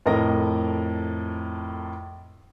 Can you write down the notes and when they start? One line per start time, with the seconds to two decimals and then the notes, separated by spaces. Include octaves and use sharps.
0.06 F2 A2 A#4 D#5 A#6